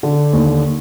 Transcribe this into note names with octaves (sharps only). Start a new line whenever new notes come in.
D3
D#2